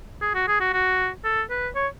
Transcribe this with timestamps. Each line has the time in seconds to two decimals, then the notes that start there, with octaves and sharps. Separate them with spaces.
0.21 G#4
0.35 F#4
0.47 G#4
0.60 F#4
0.73 F#4
1.24 A4
1.50 B4
1.75 C#5